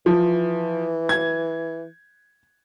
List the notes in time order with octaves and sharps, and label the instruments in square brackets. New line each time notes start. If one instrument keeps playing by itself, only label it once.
[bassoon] E3 [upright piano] F3
[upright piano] G#6